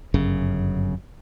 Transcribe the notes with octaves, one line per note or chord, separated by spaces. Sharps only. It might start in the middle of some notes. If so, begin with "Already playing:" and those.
G1 F#2 C#3